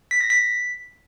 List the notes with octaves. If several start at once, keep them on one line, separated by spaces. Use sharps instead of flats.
B6
A#6
B6